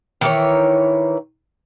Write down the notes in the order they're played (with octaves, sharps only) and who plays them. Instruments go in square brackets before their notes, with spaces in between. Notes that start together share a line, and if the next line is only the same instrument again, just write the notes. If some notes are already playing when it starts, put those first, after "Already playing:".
[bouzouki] D#3 E3 C#5